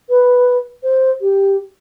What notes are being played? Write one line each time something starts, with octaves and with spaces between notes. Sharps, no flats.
B4
C5
G4